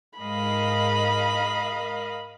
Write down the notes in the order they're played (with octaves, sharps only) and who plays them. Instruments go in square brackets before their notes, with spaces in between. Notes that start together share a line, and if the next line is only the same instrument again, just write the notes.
[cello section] G#2 G#3 [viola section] A#4 D#5 F5 [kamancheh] B5